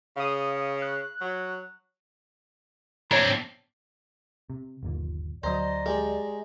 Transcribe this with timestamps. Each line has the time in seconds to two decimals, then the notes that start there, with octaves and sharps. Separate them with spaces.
0.16 C#3 F5 D#6
0.82 F#6
1.21 F#3
3.11 C4 D4 C#5 E5 A#5
4.50 C3
4.83 G1 D#2 A#2
5.43 D2 F#3 C5 D5 D#5 A#5
5.86 G#3 G4